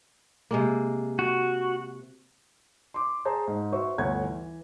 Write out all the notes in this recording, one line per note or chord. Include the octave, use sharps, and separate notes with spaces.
C3 G#3 A#3
F#4
C6 D6
G#4 C5 A5 A#5 C6
G#2
F#4 B4 C5 E5 C#6
G1 D2 C#5 F#5 G#6
E3